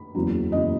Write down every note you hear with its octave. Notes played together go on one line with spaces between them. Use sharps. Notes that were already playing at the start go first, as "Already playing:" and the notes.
Already playing: B5
F#1 E2 C#3 F#3
F#1 E2 C#3 F#3 D#5